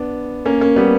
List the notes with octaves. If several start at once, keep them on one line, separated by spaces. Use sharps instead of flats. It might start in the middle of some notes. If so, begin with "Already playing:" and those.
Already playing: B3 D4
A#3 C#4
A#3 C#4
G3 B3